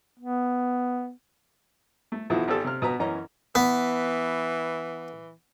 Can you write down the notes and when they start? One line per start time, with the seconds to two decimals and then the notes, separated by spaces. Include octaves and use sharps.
0.19 B3
2.12 A3
2.30 B1 B2 E3 F3 E4
2.48 G#1 G4 A4
2.64 C3 F6
2.82 B2 B4 A#5
3.00 F#2 E3 C#4 D#5 A#5
3.55 E3 B3